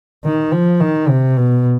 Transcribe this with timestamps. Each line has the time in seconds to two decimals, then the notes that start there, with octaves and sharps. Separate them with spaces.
0.25 D#3
0.52 F3
0.80 D#3
1.09 C3
1.37 B2